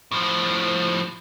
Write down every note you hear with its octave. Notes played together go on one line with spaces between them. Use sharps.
A2 F3